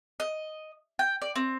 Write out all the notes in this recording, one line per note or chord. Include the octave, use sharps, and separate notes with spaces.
D#5
G5
D5
C4